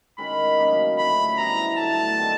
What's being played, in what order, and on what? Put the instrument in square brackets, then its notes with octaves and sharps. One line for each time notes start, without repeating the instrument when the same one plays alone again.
[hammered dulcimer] D#3 G#3 C#4 F#4 [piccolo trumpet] B5
[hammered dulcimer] C#3 F#3 A#3 D#4
[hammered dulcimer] D3 F3 A3 [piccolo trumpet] B5
[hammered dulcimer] B2 G3 B3 E4 [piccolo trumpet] A#5
[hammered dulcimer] D3 F#3 A3 [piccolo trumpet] A5
[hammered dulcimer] D#3 G3 C4